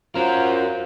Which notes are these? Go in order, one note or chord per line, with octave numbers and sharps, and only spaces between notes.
C#4 F4 F#4 A#4 C5